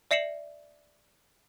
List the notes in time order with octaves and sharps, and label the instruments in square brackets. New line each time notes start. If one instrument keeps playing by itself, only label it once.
[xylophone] D5 E5 C7 C#7 E7 F#7